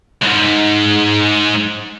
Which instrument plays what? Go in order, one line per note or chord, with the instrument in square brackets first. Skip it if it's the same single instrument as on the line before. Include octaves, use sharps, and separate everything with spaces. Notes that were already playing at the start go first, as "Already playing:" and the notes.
[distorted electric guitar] C#2 G#2